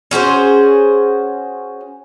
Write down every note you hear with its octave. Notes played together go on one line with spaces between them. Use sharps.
C#4 F#4 G#4 C5